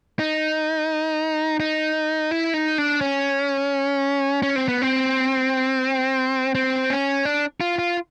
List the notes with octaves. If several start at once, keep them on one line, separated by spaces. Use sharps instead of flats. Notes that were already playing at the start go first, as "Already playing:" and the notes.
D#4
D#4
E4
D#4
D4
C#4
C#4
C4
B3
C4
C4
C#4
D4
F4
F4